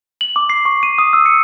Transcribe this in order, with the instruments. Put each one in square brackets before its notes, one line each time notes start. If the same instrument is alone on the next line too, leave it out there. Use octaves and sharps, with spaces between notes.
[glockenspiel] F#7
D6
C7
C#6
D#7
D#6
E6
C#7